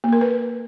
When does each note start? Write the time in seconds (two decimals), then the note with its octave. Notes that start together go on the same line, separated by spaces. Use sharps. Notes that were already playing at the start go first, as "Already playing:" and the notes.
0.04 A#3
0.13 A#4
0.21 B4